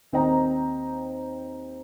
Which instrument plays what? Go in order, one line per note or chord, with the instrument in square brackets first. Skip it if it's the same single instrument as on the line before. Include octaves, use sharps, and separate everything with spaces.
[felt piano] D#2 C4 C5 D#5 G5 A#5